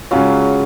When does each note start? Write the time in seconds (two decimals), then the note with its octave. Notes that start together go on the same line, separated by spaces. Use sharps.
0.11 C#3 F#3 G#3 C#4 F4